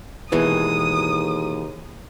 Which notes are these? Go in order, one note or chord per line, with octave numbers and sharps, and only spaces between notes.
D#2 B2 E3 G#3 D#6